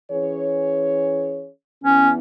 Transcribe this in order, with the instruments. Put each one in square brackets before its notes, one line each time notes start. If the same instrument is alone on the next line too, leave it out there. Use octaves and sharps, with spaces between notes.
[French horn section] E3 C#4 G#4 C#5
[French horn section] E2 E3 B3 [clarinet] C#4